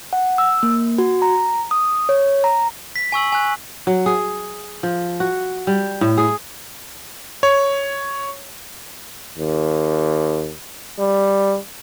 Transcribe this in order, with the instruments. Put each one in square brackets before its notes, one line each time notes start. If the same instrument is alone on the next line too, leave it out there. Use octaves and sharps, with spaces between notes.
[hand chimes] F#5
E6
A#3
F#4
A#5
D#6
C#5
A#5
[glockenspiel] B6
G#5 C#6 E6 F#7
G#5 F#6
[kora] F#3
G#4
F3
F#4
G3
A2
G#4
[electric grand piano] C#5
[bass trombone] D#2
G3